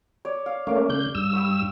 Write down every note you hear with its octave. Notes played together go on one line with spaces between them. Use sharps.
C#5 D5
F5
A3 A#3 C#4 F5 D6
C#3 G6
G2 E6
G5 B5 C#6